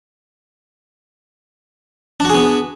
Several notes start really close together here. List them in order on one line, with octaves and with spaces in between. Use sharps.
D4 F#4 G#4 B3